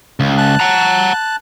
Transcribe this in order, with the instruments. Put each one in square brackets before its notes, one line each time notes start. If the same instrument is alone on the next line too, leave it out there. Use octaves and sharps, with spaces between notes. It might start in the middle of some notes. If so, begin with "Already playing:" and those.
[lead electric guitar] C#2
[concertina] A5 F#6
[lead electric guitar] F#5 A#5